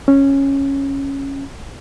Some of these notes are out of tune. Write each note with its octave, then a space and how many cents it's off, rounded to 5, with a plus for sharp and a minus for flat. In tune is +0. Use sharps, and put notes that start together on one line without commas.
C#4 -10